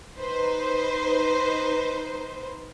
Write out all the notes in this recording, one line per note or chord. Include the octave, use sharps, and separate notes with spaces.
D#4 B4 C5